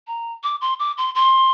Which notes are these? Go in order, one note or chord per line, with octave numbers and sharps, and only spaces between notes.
A#5
D6
C6
D6
C6
C6